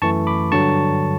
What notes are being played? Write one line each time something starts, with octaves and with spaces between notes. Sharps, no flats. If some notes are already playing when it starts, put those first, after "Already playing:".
F#2 E3 A3 A5 C#6
B5 D6
G2 D3 F#3 A5 C#6